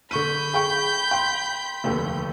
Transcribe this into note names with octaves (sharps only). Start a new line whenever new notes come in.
D3 B5 C#6 G6 D#7
G#4 G5 C#6
G5 C6
F1 D#2 D3